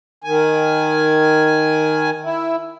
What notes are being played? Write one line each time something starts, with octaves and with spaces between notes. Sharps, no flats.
D#3 G#5
E4